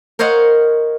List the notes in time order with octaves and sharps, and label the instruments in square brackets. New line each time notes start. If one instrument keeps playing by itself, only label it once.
[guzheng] A#4 C5 C#5 D#5 F5 F#5